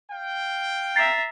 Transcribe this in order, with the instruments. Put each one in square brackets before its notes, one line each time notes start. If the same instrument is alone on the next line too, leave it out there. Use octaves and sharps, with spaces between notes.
[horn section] F5 G5
[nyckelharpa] E5 A#5 [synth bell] A6 C7